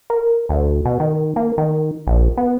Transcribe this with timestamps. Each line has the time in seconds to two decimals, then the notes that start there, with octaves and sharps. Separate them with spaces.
0.10 A#4
0.49 D2
0.85 B2
1.00 D#3
1.36 A#3
1.58 D#3
2.07 A#1
2.37 B3